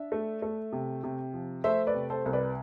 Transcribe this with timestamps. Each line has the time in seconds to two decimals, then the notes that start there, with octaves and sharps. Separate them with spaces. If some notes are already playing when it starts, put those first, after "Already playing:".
Already playing: D4 E5
0.12 A3
0.42 A3
0.73 C3
1.04 C3
1.33 F3
1.64 A3 C5 E5
1.87 B4 D5
1.94 C3
2.10 A4 C5
2.26 C2
2.33 B4 D5